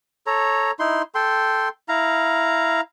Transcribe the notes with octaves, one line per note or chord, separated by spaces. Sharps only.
A4 C#5 A#5
D#4 E4 C6
A4 G5 C6
E4 F5 A#5